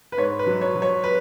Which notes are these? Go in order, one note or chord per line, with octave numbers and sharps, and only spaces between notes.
B4
G#2 C#5
B4
F#3
C#5
F#3
C#5
B4